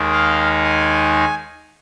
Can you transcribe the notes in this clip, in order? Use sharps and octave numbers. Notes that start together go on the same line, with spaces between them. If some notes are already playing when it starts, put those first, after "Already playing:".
Already playing: D#2 D#3 G#3 D#4
F5
G#5